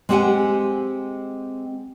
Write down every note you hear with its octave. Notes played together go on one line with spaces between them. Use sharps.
G#3 C4 G4 F5 F#5 G#5